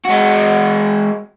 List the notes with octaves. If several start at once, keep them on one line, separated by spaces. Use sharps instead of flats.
G#3 F#4